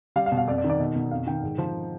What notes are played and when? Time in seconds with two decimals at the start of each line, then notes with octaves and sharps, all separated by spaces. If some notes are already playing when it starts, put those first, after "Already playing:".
0.16 G3 F5
0.26 F5
0.32 B2
0.38 F5
0.47 F2 D5
0.58 D5
0.64 D#3
0.70 D5
0.79 B2 D#5
0.96 B2
1.11 F2 F5
1.27 D#3 G5
1.43 G#2
1.58 F3